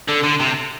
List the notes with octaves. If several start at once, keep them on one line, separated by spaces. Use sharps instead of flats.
D3
D3
C3